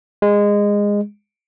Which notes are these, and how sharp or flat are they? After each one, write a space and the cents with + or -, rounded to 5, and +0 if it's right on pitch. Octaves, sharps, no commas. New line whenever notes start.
G#3 -20